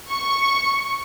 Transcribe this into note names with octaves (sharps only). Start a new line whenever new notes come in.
C#6